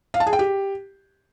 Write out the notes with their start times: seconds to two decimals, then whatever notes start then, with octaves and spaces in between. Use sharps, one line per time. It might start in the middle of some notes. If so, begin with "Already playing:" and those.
0.14 F5
0.20 A5
0.27 G#4
0.33 G5
0.39 G4